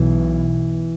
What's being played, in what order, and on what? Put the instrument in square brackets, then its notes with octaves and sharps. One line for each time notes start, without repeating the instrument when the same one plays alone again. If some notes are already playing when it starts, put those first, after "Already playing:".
Already playing: [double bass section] B1 B2 [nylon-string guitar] E3